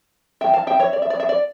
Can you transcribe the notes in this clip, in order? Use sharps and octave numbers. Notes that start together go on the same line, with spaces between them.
E3 G3 D4 E5 G5
F5 A5
E5 G5
C#5 E5
D5
E5
D5
E5
D5